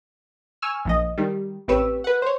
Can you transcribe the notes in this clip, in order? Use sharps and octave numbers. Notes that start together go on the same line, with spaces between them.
G#5 C#6 E6 F6
A#1 F3 D#5
D#3 G3
A1 C4 G4 B4 C#5 E6
B4 F#5
C5 C#5